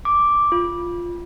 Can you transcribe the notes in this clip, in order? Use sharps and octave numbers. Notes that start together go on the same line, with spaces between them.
D6
F4